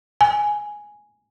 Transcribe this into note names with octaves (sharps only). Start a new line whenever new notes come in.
G#5